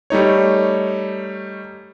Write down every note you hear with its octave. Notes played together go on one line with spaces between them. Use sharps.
G3 A3 D#4 C#5